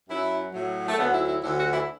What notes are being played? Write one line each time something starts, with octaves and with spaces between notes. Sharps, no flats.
F#2 F#3 E4
A2 F#3
A3
D2 D3 F#3 B3
E4
E4
D2 D3 F#3 E4
F#4
E4